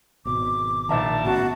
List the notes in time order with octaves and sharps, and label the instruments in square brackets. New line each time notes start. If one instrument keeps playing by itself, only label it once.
[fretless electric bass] G#1 B2 [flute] D6
[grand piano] A#1 E5 A#5 [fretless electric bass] D#3 [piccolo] A5
[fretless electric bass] A2 C#3 B3 [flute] F#4